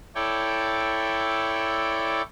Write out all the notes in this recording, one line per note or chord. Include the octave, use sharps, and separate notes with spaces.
E4 A4 C#5 D5 G5